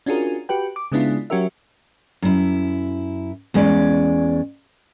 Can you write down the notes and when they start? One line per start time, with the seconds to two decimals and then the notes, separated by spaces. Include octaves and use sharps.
0.06 C#4 D4 F4 F#4 G#4 A#4
0.49 F#4 G4 B4 G5
0.76 D6
0.92 C#3 G#3 B3 D4 E4 F4
1.30 F#3 C#4 F#4 G4 A#4 E5
2.22 F#2 E4
3.54 E2 G#3 C#4 D5